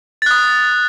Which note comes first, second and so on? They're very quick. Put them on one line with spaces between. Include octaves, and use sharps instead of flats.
A6 F#6 D#6